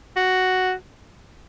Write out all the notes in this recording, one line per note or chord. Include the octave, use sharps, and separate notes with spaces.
F#4